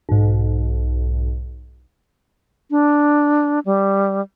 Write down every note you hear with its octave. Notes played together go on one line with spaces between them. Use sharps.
B1 G#2
D4
G3